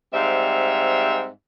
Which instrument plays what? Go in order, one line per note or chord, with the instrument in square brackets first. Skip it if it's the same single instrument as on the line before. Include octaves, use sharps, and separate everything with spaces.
[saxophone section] G#2 G3 C4 E5 F5